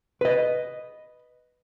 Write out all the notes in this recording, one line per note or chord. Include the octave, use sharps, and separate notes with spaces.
B4 D#5